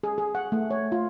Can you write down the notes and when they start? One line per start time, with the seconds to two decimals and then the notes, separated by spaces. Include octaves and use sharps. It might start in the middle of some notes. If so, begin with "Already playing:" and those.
0.03 G#4
0.18 G#4
0.35 F#5
0.52 A3
0.71 C#5
0.92 F4